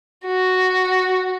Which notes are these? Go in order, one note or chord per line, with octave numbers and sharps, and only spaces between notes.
F#4